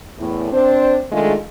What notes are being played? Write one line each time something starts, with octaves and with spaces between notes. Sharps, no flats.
E2 A2
C4 D4 C5
D#3 G#3 A3 D4 F4 G#4